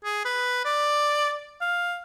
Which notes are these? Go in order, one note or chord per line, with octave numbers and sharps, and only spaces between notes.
G#4
B4
D5
F5